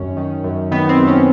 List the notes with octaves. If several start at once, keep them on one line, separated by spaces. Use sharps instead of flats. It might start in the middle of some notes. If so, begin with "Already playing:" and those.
Already playing: F#2 D#3 C#4
D#3
F#2
D#3 B3
C4
F#2
C#4